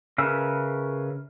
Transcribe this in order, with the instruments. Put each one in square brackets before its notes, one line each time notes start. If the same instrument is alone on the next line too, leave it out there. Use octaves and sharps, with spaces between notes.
[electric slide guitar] C#3 A#4 B4 E5